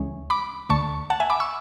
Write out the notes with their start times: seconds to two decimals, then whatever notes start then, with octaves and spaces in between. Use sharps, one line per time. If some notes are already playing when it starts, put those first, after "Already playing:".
Already playing: D2 C#3 E3 G#3 C#4
0.30 B5 D6
0.69 D2 D3 A3 A5 C#6
1.10 F#5 A5
1.20 E5 G#5
1.30 B5 D6
1.40 C#6 E6